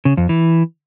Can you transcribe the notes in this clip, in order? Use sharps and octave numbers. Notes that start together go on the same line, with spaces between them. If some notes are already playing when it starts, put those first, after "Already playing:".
C#3
F2
E3